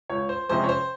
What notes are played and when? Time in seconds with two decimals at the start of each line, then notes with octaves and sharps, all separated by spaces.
0.10 C#2 C#5
0.29 C5
0.49 C3 F3 G#3 C#4 C5
0.64 C#5
0.69 C5